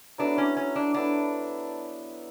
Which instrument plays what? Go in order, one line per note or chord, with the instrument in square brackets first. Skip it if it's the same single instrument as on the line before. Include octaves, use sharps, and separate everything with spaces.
[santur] F#3 B3 E4 A4 [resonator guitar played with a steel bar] D4
[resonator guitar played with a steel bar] C#4
C#4
D4
[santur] F#3 B3 E4 A4 [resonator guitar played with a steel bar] D4